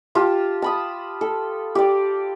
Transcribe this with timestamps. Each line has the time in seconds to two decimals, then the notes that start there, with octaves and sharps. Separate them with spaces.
0.15 F4 G4 A5
0.62 A5 B5 D#6
1.21 A4
1.75 G4 D5